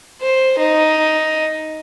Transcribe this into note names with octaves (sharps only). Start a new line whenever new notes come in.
C5
D#4